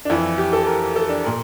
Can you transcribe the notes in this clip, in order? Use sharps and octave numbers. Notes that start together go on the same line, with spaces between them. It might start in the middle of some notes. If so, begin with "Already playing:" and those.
D4
F2 E3 E4
G4
A4
A#4
A4
D4
A#2 A#4